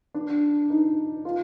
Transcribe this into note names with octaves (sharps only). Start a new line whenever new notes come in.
D4
D#4
F4